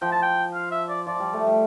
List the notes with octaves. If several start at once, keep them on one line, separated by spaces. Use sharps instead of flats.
F3 G5
A5
G5
F5
E5
D5
F3 D5
G3
A3
G3